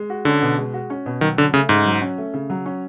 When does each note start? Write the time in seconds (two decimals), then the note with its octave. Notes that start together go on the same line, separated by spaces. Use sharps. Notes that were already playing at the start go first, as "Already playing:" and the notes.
Already playing: G#3
0.10 F#4
0.25 D3 C#4
0.42 B2
0.58 G#3
0.74 F#4
0.90 C#4
1.06 B2
1.21 D#3 F#3
1.38 D3 C#4
1.54 C#3 A3
1.69 G#2 C#3
1.85 F#3
2.02 C#4
2.18 A3
2.34 C#3
2.50 F#3
2.66 C#4